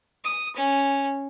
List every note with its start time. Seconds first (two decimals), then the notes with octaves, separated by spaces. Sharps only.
0.24 D#6
0.56 C#4